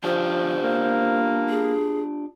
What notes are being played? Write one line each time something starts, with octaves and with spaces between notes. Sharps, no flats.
F3 D4 F4 G4 C5
A#3
G#4